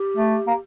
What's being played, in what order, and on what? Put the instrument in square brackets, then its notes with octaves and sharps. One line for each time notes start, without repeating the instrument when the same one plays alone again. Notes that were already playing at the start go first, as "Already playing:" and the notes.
Already playing: [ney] G4
[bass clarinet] A3
A#3